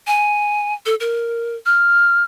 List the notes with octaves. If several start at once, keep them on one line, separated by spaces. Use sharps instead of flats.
G#5
A4
A#4
F6